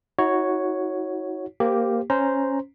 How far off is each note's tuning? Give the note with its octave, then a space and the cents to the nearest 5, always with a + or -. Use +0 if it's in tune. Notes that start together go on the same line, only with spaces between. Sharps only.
D#4 +45 F#4 +0 C#5 +0
A#3 +0 G4 +0 C5 -15
C#4 -5 C5 -10 A#5 +0